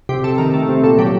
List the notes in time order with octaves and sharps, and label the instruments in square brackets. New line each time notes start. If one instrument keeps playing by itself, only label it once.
[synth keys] C3 G4
C3 A4
D#3 A#4
A3
C3
A#2 A4
F#3 G4